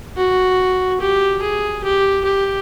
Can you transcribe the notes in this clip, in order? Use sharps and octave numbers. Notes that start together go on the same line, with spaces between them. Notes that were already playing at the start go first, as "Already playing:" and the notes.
F#4
G4
G#4
G4
G4